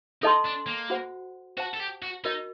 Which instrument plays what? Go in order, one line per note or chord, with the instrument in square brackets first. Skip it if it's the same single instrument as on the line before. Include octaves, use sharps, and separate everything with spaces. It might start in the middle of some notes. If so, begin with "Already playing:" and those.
[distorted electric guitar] D#4 [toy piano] A4 D#5 A5 C6
[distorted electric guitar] D4
A#3
[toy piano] F#4 C5 F#5
[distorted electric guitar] F#4 [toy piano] C5 F#5 A5
[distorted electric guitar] A4
G4
F#4
[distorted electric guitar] D#4 [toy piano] F#4 A#4 D#5